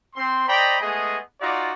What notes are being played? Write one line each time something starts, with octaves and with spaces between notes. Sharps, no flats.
C4 C6
C5 D5 D#5 G5 A#5 B5
G#3 A3 B3 G#4 D#5
D#4 F4 F#4 D5